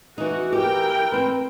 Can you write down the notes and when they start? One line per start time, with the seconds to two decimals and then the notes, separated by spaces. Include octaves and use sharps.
0.18 E3 D#4 F#4
0.53 E3 G4 A#4 G5
1.12 C4 B4